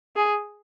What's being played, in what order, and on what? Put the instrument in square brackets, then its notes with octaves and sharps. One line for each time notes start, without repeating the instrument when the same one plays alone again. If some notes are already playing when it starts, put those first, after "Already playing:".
[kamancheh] G#4